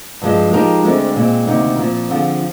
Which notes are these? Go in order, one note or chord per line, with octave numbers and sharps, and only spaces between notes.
G2 F3 G#3
F3 G#3 D#4 G4 A#4
D2 D3 G#3 C4
A#2 G#3 C4
D2 C3 D#3 A#3 D#4
A#2 F3 C4
D3 F3 C4 F4 G#4